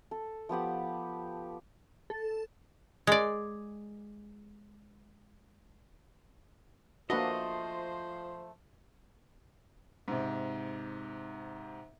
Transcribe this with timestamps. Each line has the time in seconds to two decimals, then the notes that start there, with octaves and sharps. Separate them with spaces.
0.11 A4
0.49 F3 B3 G4 F#5
2.10 A4
3.07 G#3 D5
7.10 F3 A3 A#3 D4 F#4 B4 C5 D#5
10.08 G#2 C3